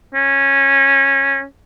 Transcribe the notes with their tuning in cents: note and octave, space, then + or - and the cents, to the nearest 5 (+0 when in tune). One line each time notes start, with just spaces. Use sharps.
C#4 -15